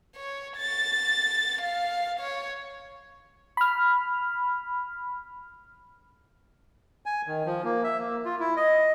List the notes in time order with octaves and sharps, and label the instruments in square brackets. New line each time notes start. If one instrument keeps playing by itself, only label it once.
[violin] C#5
A6
F5
C#5
[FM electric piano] B5 F6
[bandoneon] G#5
D#3
F3
A#3
E5
A#3
F4
E4
D#5